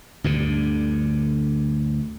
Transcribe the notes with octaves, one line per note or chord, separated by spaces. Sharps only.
D2 G2 D3